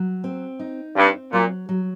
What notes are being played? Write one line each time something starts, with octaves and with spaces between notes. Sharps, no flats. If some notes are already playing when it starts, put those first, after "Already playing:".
Already playing: F#3
C4
D#4
G2 C4
A#2 F#3
F#3